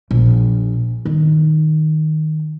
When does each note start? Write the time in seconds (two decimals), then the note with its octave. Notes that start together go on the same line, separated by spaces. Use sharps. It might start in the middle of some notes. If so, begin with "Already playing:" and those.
0.11 A#1
1.05 D#3